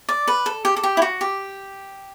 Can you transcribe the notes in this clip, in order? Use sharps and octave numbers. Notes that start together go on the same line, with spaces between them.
D5
B4
A4
G4
A4
G4
E4
F#4
G4